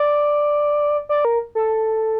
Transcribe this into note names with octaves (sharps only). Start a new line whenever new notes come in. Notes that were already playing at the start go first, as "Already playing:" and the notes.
Already playing: D5
D5
A#4
A4